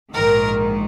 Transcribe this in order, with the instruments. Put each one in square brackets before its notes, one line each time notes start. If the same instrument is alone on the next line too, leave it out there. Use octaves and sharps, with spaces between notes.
[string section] A#1 G#2 D#3 A#4